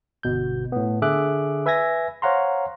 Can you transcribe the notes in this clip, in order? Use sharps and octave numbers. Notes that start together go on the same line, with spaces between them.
G1 B2 G6
A2 B3
D3 G#4 E5 D6 F#6
B4 E5 G#5 G#6 A#6
C5 C#5 F5 F#5 A#5 C6